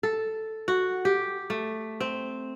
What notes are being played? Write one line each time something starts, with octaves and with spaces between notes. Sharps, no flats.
A4
F#4
G4
A3
C4